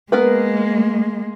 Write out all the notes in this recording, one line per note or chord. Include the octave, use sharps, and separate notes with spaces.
G#3 A#3 B3 A#4 B4